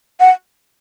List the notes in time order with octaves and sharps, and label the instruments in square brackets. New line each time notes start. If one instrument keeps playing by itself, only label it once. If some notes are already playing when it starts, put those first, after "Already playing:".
[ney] F#5